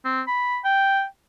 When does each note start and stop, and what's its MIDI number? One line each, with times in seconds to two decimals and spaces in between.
0.05 0.21 60
0.27 0.59 83
0.65 1.04 79